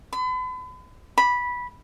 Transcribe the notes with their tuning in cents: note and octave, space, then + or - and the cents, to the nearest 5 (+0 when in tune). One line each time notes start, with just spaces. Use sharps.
B5 +40
B5 -10